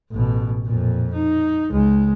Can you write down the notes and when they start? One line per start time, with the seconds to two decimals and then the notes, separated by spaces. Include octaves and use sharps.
0.11 A1 B2
0.66 F2 A#2
1.13 D#4
1.71 C#2 G#3